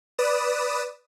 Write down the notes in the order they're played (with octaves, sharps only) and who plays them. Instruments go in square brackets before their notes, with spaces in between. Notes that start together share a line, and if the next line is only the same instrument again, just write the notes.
[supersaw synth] B4 D5 D#6 E7